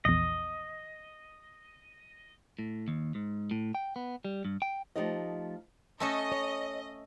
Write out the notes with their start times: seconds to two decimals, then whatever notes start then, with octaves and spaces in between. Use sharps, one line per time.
0.05 A#1 E2 D#5
2.59 A2
2.88 D#2
3.15 G#2
3.51 A2
3.75 G5
3.96 B3
4.25 G3
4.45 G2
4.62 G5
4.96 F3 A3 D#4 G4 D#5
6.00 A3 C#4 A4 D#5
6.32 C#5